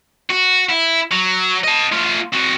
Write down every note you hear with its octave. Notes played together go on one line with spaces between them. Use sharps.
F#4
E4
F#3
D#5 A5
A3 F4
C4 F#4